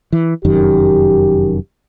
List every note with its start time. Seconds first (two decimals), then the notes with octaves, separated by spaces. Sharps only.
0.13 E3
0.45 F1 F#2 D#3 G4